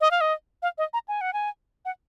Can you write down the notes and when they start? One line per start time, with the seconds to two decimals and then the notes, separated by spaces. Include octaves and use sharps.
0.01 D#5
0.11 F5
0.21 D#5
0.62 F5
0.78 D#5
0.93 A#5
1.08 G#5
1.21 F#5
1.33 G#5
1.85 F#5